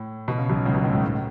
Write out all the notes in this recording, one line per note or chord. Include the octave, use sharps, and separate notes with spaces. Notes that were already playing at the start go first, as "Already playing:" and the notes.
Already playing: A2
B2
C#3
B1 B2
C#2 C#3
B1 B2
A2
G#2
A2